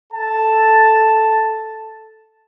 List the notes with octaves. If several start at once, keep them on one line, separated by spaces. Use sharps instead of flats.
A4 A5